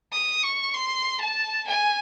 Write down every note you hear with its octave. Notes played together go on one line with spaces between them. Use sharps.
D#6
C#6
C6
A5
G#5